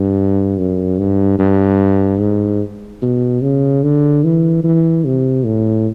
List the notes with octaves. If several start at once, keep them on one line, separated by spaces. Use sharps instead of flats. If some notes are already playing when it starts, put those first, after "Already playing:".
Already playing: G2
F#2
G2
G2
G#2
B2
C#3
D3
E3
E3
C3
A2